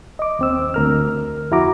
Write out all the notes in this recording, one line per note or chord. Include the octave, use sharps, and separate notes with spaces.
D#5 D6
D#2 C4 E6
D2 A#4 F6
F2 E4 F#4 A#5 D6